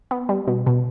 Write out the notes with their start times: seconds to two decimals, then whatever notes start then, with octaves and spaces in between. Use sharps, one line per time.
0.11 B3
0.29 G3
0.47 B2
0.67 B2